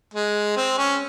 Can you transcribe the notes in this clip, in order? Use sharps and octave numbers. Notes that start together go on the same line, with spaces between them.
G#3
C4
C#4